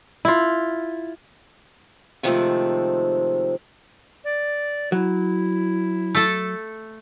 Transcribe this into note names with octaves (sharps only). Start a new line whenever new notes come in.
E4 F4
C3 D#3 F3 G#3 A3 C4
D5
F#3 E4
A3 A4